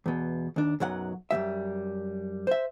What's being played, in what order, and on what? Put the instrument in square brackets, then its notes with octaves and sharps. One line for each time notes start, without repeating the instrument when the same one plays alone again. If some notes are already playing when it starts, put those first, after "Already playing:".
[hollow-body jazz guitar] E2 B2
D#2 D4
B1 F#2 F#3 F#5
F#2 D#3 G3 E5
C5 E5